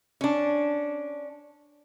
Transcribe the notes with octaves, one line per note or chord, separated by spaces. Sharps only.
C#4 D4